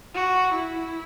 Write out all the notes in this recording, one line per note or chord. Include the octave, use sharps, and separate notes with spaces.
F#4
E4